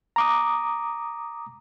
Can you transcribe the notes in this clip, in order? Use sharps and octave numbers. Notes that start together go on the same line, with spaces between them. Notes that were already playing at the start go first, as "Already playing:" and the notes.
A#5 D6 D#6